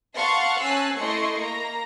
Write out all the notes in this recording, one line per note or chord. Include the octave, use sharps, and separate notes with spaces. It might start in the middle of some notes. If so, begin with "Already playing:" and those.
F5 F#5 A5 C6 C#6
C#4 G#5 A5 E6 F#6 C7
A3 E4 D#5 C6 C#6
A#3 A#5